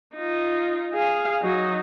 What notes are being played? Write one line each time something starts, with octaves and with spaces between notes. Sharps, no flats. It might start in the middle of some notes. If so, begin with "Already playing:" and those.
D#4 F4
G#4 F5
F#3 D#4